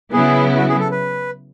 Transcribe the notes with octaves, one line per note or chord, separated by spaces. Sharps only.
C#3 F#3 B3 E4 G#4
F#4
G#4
A4
B4